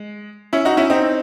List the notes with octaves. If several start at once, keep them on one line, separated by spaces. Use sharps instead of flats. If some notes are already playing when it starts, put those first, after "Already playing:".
Already playing: G#3
C#4 E4
D#4 F#4
C#4 E4
C4 D#4